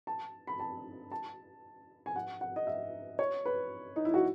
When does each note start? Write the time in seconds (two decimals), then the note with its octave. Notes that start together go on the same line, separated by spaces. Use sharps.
0.07 A5
0.47 B5
0.60 A5
1.12 A5
2.06 G#5
2.16 F#5
2.41 F#5
2.56 D#5
2.67 E5
3.19 C#5
3.45 B4
3.96 D#4
4.05 E4
4.14 F#4